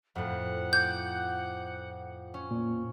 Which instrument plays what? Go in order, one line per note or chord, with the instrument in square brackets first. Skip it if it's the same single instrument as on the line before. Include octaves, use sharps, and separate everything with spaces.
[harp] F2 A2 [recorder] F#5
[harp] D6 [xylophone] G6
[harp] C#4
[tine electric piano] A#2